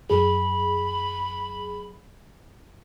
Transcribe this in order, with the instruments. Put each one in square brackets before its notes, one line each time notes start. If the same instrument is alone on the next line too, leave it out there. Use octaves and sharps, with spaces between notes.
[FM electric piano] F#2 G#4 [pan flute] B5